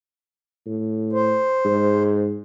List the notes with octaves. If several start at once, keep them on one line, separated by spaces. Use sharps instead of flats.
A2
C5
G#2